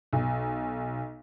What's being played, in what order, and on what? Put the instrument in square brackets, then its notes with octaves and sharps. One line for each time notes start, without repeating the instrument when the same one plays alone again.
[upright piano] B1